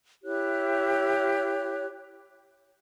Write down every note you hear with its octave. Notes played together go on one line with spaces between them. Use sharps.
E4 G4 C#5 F#6